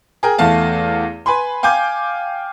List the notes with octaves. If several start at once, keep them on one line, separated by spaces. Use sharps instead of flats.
G#4 A#4 G5
E2 A3 F5 A5
B4 G#5 B5 C6
F5 G5 G#5 D6 G6